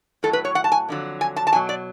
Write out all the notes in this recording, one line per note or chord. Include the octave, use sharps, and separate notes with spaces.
A2 F#3 A4
B4
C#5
F#5
A5
G#5
F2 D3 F#3
G#5
A5
A5
B2 F#3 G#5
D5